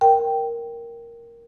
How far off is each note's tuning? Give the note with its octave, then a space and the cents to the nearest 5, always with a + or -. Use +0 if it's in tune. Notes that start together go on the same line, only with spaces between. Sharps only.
A#4 +0 G5 +0